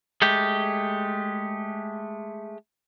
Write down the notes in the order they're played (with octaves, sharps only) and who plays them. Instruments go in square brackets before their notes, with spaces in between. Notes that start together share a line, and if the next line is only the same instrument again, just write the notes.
[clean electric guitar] G#3 A3 G4